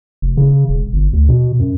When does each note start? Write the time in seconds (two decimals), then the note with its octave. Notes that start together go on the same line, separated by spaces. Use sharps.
0.22 F1
0.37 C#3
0.69 E1
0.93 G1
1.13 D2
1.29 B2
1.59 F#2